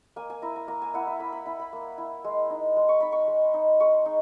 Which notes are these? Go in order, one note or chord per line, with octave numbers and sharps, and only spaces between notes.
A#3 G#5
G#5
E4 A#5
A#5
A#3 A#5
G#5
E4 F#5
E5
A#3 B5
B5
E4 B5
B5
A#3
E4
G#3
D#4
G#3
C#6
D#4 B5
C#6
G#3
D#4
G#3 C#6
D#4